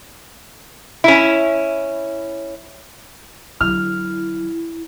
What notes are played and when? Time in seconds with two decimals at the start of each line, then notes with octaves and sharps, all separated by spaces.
1.04 C#4 E4
3.60 D3 F#3 E4 F6